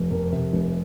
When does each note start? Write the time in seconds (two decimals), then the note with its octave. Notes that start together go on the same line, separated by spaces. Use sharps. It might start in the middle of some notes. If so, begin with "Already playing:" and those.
Already playing: F1
0.11 F2 A#4
0.32 C3
0.53 F1